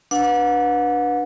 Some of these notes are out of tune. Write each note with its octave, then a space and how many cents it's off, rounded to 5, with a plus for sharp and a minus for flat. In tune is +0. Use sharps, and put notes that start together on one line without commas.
D4 +0 B4 -15 F#5 -40